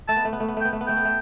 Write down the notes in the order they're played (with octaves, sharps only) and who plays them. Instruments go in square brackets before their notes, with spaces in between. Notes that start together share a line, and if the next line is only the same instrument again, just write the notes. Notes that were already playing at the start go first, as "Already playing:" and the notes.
[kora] A3 [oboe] A5
[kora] B3
A3
B3
A3
B3
[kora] A3 [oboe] G5
[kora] B3
A3
B3
[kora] A3 [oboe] G5
[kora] B3
A3